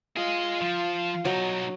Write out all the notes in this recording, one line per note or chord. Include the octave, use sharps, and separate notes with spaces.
F4 G#4 D#5
F3
B2 F#3 D#4